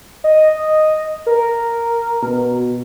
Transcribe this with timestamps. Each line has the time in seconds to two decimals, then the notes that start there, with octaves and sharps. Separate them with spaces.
0.24 D#5
1.26 A#4
2.23 B2